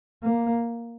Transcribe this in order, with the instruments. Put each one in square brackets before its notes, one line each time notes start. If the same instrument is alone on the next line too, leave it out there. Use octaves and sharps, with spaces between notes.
[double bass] A#3